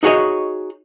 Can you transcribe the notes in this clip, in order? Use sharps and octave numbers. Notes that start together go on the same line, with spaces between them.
D#4 F#4 G#4 C#5 D#5